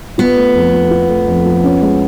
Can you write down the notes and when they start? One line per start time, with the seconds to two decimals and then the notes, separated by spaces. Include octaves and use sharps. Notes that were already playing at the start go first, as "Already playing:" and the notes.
0.18 B3 F4
0.36 A3
0.55 F2
0.73 F3
0.91 F4
1.09 A3
1.27 F2
1.46 F3
1.64 C#4
1.82 G#3